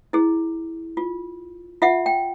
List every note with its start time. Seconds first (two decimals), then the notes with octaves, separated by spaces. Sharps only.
0.13 E4 G#4
0.97 F4
1.82 F4 E5 F#5
2.06 G5